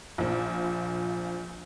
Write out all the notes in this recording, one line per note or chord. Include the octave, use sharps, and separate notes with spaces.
A#1 F3